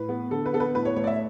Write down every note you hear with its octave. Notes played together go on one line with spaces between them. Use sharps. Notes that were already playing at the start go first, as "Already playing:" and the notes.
Already playing: A2 B4
B3
D3 A4
B4
B3 A4
B4
A2 B4
C#5
A3 C#5
D5
E5